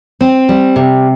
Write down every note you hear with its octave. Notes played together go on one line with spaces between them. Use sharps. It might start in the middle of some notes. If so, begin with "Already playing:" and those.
C4
G3
C3